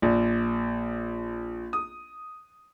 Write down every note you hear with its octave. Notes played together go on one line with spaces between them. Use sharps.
A#1
D#6